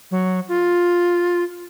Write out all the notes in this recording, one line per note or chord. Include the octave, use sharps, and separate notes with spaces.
F#3
F4